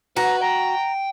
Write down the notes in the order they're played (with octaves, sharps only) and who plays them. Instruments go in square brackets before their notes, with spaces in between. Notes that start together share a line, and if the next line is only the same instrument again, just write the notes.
[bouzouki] F#4 [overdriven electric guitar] B4 [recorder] A#5
[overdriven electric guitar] G5 [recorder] A#5